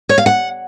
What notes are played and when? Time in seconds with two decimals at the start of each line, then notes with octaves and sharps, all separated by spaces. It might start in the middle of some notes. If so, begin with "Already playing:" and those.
0.09 C#5
0.18 F5
0.26 F#5